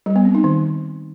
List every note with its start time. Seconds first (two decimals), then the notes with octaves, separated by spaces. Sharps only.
0.06 G3
0.16 B3
0.25 C4
0.35 D#4
0.44 D#3